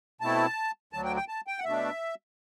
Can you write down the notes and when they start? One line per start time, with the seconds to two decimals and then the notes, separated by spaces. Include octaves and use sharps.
0.21 B2 A3 C4 E4 A5
0.93 D2 D3 F#3 A5
1.05 G5
1.16 G5
1.28 A5
1.47 G5
1.59 F#5
1.64 B2 A3 D4 E5